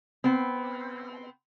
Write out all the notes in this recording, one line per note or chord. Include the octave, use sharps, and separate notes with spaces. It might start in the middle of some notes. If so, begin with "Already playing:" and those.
B3 C4